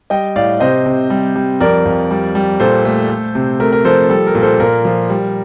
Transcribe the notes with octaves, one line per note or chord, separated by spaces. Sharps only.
G3 D#5 G5
A2 D5 F5
C3 C5 D#5
C3
G3
G3
F2 A#4 D5
F2
G3
G3
A#2 A4 C5
A3
A3
C3
A3 A#4
A#4
F3 A4 C5
G3 A4
A#4
A#2
A4 C5
A#2 A#4
F3
G3